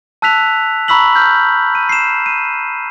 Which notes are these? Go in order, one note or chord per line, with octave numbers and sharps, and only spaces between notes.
A5 E6 F#6 B6 F7
A#5 B5 C#6 E6 B6 F#7
F6 G6
D#7
C7 E7
D#7